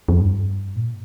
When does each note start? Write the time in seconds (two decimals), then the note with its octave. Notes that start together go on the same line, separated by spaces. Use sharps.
0.08 F2
0.20 G2
0.76 A#2